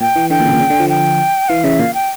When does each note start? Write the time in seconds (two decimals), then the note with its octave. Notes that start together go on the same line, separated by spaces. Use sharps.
0.01 A#2 G5
0.16 E3
0.30 D3 G5
0.40 A#2
0.45 C#3
0.53 A#2
0.60 C#3
0.70 D3
0.80 F3
0.90 G5
1.49 E3 F5
1.64 C#3 E5
1.79 A#2 F5
1.94 G5